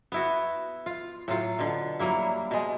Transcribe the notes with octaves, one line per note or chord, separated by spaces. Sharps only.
B3 E4 F#4
F4
A2 F#3 F4
B2 D3
F#3 G3 A#3 E4
B2 G#3